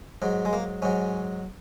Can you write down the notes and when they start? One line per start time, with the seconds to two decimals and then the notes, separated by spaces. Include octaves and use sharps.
0.22 G#2 F#3
0.45 G#3
0.53 A#3
0.82 G#2 F#3 C#4